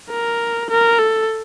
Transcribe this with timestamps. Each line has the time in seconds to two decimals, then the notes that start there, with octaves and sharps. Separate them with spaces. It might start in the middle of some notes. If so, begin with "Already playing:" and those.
0.11 A#4
0.70 A#4
0.99 A4